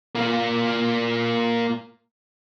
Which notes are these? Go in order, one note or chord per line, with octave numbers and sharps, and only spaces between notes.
A#3 F4